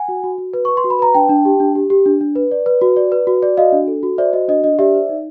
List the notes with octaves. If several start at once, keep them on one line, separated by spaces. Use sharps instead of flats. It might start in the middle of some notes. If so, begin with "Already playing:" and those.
Already playing: F#5 G#5
F#4
F#4
F#4
B4
B4 C#6
C6
F#4
B5
B4 A#5
D4 G5 A5
D4
G4
D4
G4
G4
D4
D4
B4
D5
B4
F#4
D5
B4
F#4
D5
F#4 D#5 F5
D4
A4
F#4
C5 D5 E5
F#4 D#5
D4 D#5
D4 D#5
G4 D5 E5
C5
D#4